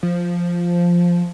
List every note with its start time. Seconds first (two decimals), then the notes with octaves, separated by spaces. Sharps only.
0.03 F3